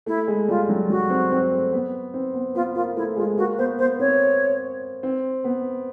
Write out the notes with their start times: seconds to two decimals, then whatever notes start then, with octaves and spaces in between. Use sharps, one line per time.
0.06 A3 E4
0.28 G#3
0.48 G3 F4
0.69 F#3
0.89 F#3 F#4
1.10 C4
1.31 C4
1.52 A3
1.73 B3
2.14 C4
2.34 B3
2.55 B3 F4
2.75 A#3 F4
2.96 A3 E4
3.16 G#3 F4
3.37 A#3 F#4
3.58 B3 C5
3.79 B3 C5
3.99 C4 C#5
5.03 C4
5.44 B3